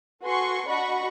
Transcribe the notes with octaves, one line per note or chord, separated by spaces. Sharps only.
F#4 A4 B4 G#5 C6 C#6
D4 F#4 D#5 F#5 B5 C#6